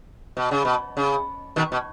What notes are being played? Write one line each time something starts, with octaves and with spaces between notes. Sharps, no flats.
B2
C#3
B2
C#3
B2 D#3
B2